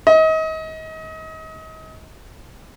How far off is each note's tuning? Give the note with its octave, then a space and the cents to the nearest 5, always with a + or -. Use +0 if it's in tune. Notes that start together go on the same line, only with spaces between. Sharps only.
D#5 +35